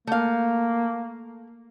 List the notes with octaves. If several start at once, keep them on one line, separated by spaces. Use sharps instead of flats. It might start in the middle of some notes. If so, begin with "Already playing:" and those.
A3 A#3 F5